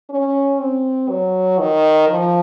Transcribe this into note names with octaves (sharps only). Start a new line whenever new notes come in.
C#4
C4
F#3
D#3
F3